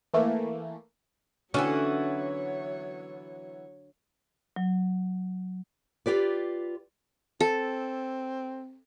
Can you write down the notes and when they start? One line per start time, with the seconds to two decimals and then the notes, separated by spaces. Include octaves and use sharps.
0.14 E3 A3 A#3
1.54 D3 E3 F#3 B3 C#4 F#4 C#5
4.56 F#3
6.06 F4 G4 B4 D5
7.40 C4 A4